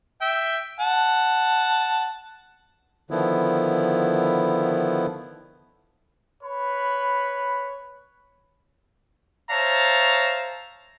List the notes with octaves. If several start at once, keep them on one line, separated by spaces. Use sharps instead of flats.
E5 G5
F#5 A5
D3 D#3 F3 B3 E4
B4 C#5 B5
C5 C#5 E5 F5 A5 A#5